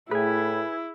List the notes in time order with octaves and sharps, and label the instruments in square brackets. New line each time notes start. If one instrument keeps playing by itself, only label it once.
[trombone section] A2 [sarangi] E4 [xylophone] G#4 [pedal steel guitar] B4 G#5